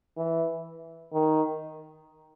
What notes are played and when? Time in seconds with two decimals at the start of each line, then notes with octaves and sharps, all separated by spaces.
0.17 E3
1.13 D#3